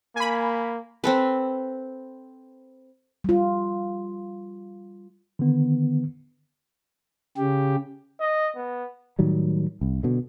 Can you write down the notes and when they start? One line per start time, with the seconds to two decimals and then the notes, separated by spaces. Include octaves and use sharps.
0.16 A#3 G#5 B5
1.04 C4 A4 B4
3.24 G3 F4
5.39 D3 D#3 B3
7.37 C#3 G4
8.20 D#5
8.56 B3
9.19 A2 D#3 F#3 G3
9.81 C2
10.03 B2 D3